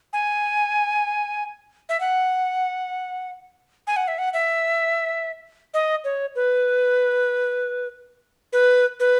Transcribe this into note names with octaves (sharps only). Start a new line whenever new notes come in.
G#5
E5
F#5
G#5
F#5
E5
F#5
E5
D#5
C#5
B4
B4
B4